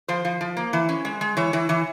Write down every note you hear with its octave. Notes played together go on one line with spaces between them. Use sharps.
F3 C5
F3
F3
A#3
E3
C#4
G#3
G#3
E3 C#5
E3
E3